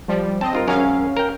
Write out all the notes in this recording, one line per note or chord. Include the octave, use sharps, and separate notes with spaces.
F3 G3
C4 D#5 A5
G2 F4 A#4
G#1 F#2 C#4 A#4 F5
A#4 G5